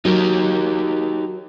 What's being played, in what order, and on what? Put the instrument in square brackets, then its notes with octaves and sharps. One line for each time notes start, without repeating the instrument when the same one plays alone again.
[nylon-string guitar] F#3 [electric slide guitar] D#4 G4 A#4